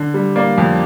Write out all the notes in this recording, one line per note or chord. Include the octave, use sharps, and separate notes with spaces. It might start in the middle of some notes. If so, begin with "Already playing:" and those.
Already playing: D3
G3
A#3 D5
F2